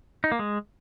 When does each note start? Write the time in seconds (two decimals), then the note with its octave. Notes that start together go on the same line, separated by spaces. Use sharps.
0.24 D#4
0.32 A#3
0.39 G#3